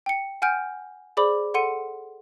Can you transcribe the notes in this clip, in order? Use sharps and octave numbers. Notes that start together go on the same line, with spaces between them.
G5 C#7
F#5 G#5 F6 G6 D7
G#4 C5 D5 B5 D6 F#7
A4 F#5 C6 C#7 D#7